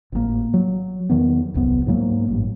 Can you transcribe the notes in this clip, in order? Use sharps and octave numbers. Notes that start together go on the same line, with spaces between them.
G#1 A2 D3 A#3
F#3
E2 D#3 F#3 B3
D#1 C2 F#2 B3
G#2 F#3 A#3
A1 G2